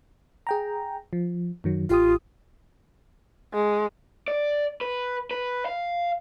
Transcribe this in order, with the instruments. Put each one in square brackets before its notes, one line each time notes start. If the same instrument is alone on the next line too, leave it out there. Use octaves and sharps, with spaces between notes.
[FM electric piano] G#4 G5 A#5
F3
F#2 D#3 F#3
[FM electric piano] A1 G4 D#6 [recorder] F4
[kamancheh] G#3
[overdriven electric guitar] D5
B4
B4
F5